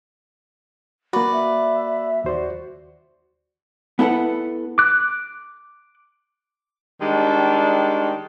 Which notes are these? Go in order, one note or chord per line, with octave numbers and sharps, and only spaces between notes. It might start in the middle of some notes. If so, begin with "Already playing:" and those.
A#3 F#4 B4 D5
E5
D#2 F#4 C5 D5
B3 E4 A4 B4 F#5
D6 F#6
D#3 G3 G#3 D4